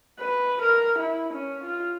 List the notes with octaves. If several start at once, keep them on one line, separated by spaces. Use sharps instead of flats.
B4
A#4
E4
C#4
F4